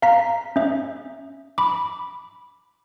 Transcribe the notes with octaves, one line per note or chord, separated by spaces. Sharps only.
F5 A#5 B6
C#4 E5
B5 D6